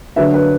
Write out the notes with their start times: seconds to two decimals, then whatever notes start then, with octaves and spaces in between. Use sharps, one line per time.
0.16 D3 F#3 D4 B4 E5
0.34 B4